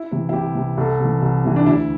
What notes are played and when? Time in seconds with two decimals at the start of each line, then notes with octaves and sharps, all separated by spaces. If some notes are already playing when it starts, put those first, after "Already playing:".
Already playing: E4
0.11 C3 E3
0.29 E4
0.33 C2 G4
0.55 C3 E3
0.77 C2 A4
1.00 C3 E3
1.22 C2
1.44 C3 E3
1.56 D4
1.66 D2 E4